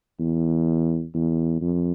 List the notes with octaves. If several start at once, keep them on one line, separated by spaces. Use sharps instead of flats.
E2
E2
F2